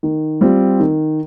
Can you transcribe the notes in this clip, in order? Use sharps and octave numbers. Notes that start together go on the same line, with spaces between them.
D#3
G3 C4 F4
D#3